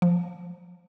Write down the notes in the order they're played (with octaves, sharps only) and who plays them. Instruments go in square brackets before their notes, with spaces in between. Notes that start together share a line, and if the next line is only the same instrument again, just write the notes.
[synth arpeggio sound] F3